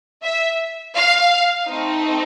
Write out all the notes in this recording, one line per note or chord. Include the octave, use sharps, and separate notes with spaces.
E5
F5
A3 C4 D#4